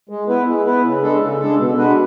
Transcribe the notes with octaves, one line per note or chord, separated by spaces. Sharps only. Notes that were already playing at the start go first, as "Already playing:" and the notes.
G#3
B3 E4 B4
G#3
B3 E4 B4
C#3
G#3 D4 A4
C#3
G#3 D4 A4
B2
G#3 D4 F#4 B4